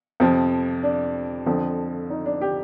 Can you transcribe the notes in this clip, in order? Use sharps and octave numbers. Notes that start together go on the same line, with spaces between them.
F2 C3 F3
D4
F2 D3 F3
D#4
D4
G4